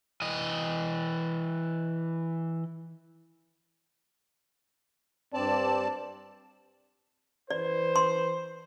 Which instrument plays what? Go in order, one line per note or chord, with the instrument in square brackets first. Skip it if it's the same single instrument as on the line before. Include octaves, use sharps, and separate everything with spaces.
[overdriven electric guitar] E3 D#5
[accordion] G2 D5 A5 [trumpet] C4
[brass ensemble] E3 B4 C5 [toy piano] D5
[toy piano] C6